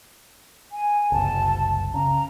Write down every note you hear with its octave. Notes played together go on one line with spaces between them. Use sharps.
G#5
F#1 C2 A5
C#3 A#5